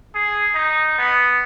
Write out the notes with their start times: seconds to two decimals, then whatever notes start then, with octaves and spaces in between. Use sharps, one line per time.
0.15 G#4
0.54 D#4
0.98 B3